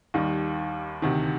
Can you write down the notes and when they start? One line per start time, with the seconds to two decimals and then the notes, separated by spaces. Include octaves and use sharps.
0.14 D#2 D#3 G3
1.02 D2 C3 D#3